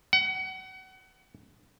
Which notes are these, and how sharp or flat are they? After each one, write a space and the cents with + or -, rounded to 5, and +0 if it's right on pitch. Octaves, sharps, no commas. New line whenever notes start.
F#5 +30